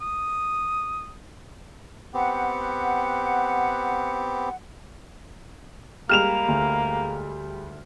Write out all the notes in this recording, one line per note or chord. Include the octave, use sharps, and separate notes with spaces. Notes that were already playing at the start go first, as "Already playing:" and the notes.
D#6
B3 C4 G4 F#5
G3 G#3 A#3 G4 F6 E7 F7
D2